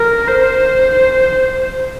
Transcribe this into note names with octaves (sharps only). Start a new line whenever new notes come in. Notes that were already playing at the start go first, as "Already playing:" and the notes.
Already playing: A#4
C5